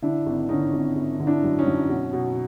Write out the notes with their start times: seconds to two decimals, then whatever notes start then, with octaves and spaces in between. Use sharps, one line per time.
0.02 D3 D4 E4
0.26 G#1
0.49 D3 C#4 D#4
0.73 G#1
0.96 G#1
1.20 D3
1.27 D4 E4
1.44 F#2
1.59 C#4 D#4
1.66 F#2
1.89 B2
2.13 B2